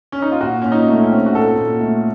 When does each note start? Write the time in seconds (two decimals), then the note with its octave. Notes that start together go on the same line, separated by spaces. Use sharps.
0.12 C#4
0.22 D#4
0.32 F4
0.41 A#2 F#4
0.62 A#2 C#4
0.72 D#4
0.88 A3
1.03 C#4
1.11 C4
1.26 F#4
1.35 A#2 A4
1.57 A#2
1.80 A3